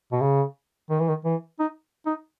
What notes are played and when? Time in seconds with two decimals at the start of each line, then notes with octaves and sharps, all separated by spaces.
0.12 B2
0.21 C#3
0.90 D#3
0.99 E3
1.08 D#3
1.25 E3
1.59 D#4
2.06 D#4